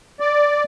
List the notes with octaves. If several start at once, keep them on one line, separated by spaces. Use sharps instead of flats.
D5